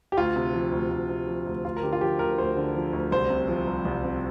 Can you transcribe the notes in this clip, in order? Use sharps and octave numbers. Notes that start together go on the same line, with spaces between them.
G4
D2 F4
C3
F3
D2
D2
C3
F3
D2
D2 F4
A#4
D3 G4
F4
F3 G4
D2 A#4
D2 C5
D3
F3
D2
C2 C5
C3
F3
C2
C2
C3